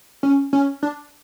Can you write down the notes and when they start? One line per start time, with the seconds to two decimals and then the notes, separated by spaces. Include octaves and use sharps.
0.23 C#4
0.53 C#4
0.83 D4